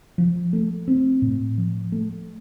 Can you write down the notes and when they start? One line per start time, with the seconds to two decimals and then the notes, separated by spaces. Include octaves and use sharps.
0.18 F3
0.53 A3
0.88 C4
1.22 A2
1.58 F3
1.92 A3